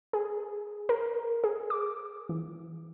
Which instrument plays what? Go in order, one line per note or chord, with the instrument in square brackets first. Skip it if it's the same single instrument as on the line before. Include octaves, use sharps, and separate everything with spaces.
[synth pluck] G#4
A#4
G#4
D6
E3